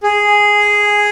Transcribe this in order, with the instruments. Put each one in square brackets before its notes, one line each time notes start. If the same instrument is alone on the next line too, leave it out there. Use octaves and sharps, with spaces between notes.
[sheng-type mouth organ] G#4